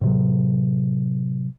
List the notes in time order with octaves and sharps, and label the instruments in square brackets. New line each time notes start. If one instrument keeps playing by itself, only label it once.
[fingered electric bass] A2 C3 F#3